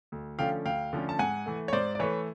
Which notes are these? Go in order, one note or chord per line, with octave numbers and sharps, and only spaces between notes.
D2
D3 F3 A3 C#4 F5 G5
D2 F5 G5
D3 F3 A3 C#4
A5
G#2 F#5 G#5
E3 A3
C#5
G#2 C5 D5
D5
E3 A3 B4 C#5